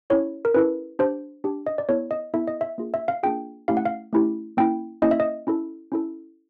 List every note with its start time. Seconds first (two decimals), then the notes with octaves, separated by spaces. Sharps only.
0.10 C#4 E4 A4 C#5
0.45 A#4
0.54 C#4 E4 A4 B4
0.99 D4 G4 C5
1.44 D4 G4
1.67 D#5
1.78 D5
1.89 B3 E4 A4 C#5
2.11 D#5
2.34 B3 E4 A4 E5
2.48 D#5
2.61 E5
2.78 A#3 D4 F4 G#4
2.94 E5
3.08 F5
3.23 A#3 D4 F4 G#4 G5
3.68 A3 C#4 E4 G4 F5
3.77 F#5
3.85 F5
4.13 A3 C#4 E4 G4
4.57 A#3 C#4 E4 G5
5.02 A#3 C#4 E4 D#5
5.11 E5
5.20 D#5
5.47 C#4 E4 A4
5.92 C#4 E4 A4